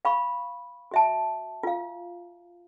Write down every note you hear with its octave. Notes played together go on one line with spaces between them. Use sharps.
F5 B5 C#6
F#4 E5 A5
F4 F5